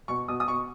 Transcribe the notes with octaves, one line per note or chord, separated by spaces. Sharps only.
B2 C#6
B2 D#6
D#6
B2 C#6